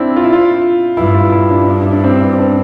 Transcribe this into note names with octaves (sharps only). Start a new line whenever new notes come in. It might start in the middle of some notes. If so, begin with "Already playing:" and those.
Already playing: C4 D4 E4
F4
E4
F4
G2 E4
F4
E4
D4
D4
E4
D4
C4
C4
D4